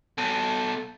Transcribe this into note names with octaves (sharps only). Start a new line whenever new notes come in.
B2 A4